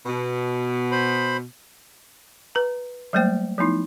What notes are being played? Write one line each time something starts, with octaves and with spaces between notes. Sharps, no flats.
B2
C5 B5
B4 A#5
F#3 G3 A3 A#3 C5 G5
F3 A3 B3 D#4 E4